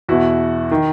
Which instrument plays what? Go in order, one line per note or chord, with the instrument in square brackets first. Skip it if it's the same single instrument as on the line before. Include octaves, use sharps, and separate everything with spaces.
[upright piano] E2 B2 E4 F#4
D#3